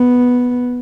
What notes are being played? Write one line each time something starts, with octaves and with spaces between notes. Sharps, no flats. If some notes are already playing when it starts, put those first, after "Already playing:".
Already playing: B3